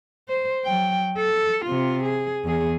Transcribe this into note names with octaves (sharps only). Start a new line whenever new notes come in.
C5
F#3 G5
A4
C3 F4
G#4
E2 G#4